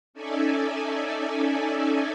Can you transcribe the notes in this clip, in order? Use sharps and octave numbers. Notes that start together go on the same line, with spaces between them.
C#4 D#4 A4 D5 E5 G#5